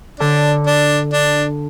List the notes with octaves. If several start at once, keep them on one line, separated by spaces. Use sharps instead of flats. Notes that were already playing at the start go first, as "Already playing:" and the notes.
D3 D4
D4
D4